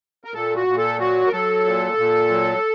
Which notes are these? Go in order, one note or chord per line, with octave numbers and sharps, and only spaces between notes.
A#4
A#2 A4
F#4
A#2
A4
F#3 F#4
A#4
F#3 A4
A#2
A#2
F#3